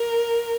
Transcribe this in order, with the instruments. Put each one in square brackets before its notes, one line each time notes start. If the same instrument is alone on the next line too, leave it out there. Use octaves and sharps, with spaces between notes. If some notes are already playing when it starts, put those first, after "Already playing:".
Already playing: [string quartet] A#4